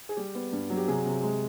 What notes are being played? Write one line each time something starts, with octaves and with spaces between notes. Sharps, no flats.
G#4
G3 G4
B3
G2
F#3
G4
C3 G#4
C3
G#3